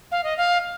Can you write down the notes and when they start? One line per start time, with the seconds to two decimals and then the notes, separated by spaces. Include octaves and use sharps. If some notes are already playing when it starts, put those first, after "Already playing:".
0.12 F5
0.24 D#5
0.37 F5